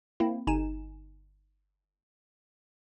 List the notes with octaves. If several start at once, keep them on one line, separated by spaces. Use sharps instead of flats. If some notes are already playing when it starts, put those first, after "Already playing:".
A#3 C4 E4
G1 D#4 G#5 E7